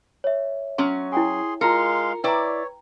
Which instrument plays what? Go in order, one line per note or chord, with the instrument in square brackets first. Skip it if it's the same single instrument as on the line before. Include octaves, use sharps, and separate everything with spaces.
[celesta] C#5 E5
[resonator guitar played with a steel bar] F#3 C#4 [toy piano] C6
[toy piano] E4 G5 G#5 [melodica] G#4 C6
[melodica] G#3 F5 C6 [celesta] F4 A#5 C#7 [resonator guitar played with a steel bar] A#4
[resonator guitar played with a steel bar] E4 D5 [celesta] B4 [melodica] C#5 [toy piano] G5 A#5